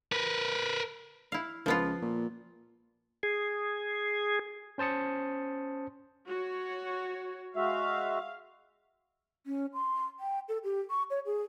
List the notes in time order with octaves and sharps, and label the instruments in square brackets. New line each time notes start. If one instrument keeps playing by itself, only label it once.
[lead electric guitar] A#4 B4
[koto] E4 F5
[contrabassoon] C#2 [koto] F3 B3 F4
[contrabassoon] A#2
[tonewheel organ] G#4
[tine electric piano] C#4 C5 A5 D#6 C#7
[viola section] F#4 C#5
[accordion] G#3 F#4 E5 [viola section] F5
[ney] C#4
C6
G5
A4
G4
C#6
C#5
G#4